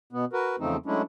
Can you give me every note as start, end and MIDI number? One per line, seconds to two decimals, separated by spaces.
0.13 0.25 47
0.13 0.25 59
0.33 0.56 66
0.33 0.56 70
0.33 0.56 71
0.59 0.77 40
0.59 0.77 49
0.59 0.77 53
0.59 0.77 57
0.59 0.77 60
0.59 0.77 63
0.86 1.02 54
0.86 1.02 56
0.86 1.02 57
0.86 1.02 61
0.86 1.02 62
0.86 1.02 64